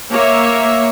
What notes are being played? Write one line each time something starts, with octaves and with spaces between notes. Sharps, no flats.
A#3 C#5 E5